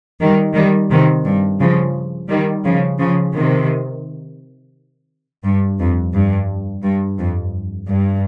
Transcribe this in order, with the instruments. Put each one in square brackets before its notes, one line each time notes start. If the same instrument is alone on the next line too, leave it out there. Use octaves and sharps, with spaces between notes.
[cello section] D#3 G3
D#3 G3
C3 D#3
G2
C#3 F3
D#3 G3
C#3 F3
C#3 F3
C3 D#3
G2
F2
G2
G2
F2
G2